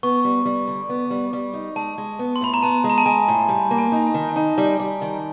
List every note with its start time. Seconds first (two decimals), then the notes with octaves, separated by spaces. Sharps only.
0.03 B3 C#6
0.24 G3
0.45 G3
0.67 D3
0.89 B3
1.10 G3
1.33 G3
1.54 D#4
1.76 G#3 A5
1.98 G#3
2.19 B3
2.36 C6
2.41 A2 B5
2.54 A#5
2.62 B3 A5
2.84 G#3
2.90 A#5
2.98 A5
3.06 G#3 G#5
3.28 A2
3.49 G3
3.71 A#3
3.78 G#5
3.92 D#4
4.07 G#5
4.14 D#3
4.29 G#5
4.36 D#4 A5
4.58 G3
4.80 G3
5.01 D#3